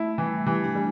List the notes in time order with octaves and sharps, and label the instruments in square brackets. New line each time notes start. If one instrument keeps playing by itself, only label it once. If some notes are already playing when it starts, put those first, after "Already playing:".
Already playing: [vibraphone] A3 [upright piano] E4
[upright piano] E3 [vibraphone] G3
[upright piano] E3 [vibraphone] G4
[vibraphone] E4
D4 G4
[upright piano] G3